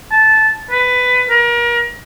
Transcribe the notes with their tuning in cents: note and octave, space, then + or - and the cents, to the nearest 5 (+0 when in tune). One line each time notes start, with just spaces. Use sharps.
A5 -10
B4 +15
A#4 +35